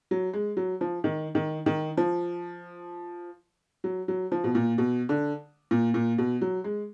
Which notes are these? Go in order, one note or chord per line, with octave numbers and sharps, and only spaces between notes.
F#3
G#3
F#3
F3
D#3
D#3
D#3
F3
F#3
F#3
F3
B2
A#2
B2
D3
A#2
A#2
B2
F#3
G#3